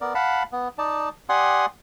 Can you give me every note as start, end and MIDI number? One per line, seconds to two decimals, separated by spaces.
0.01 0.13 59
0.01 0.13 70
0.01 0.13 74
0.15 0.43 77
0.15 0.43 78
0.15 0.43 81
0.15 0.43 83
0.52 0.68 59
0.78 1.09 63
0.78 1.09 74
0.78 1.09 81
1.29 1.66 67
1.29 1.66 74
1.29 1.66 78
1.29 1.66 80
1.29 1.66 84
1.29 1.66 87